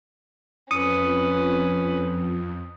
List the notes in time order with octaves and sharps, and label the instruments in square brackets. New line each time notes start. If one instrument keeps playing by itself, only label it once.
[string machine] F2 [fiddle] C#4 B4 [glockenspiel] D#6 C#7 D#7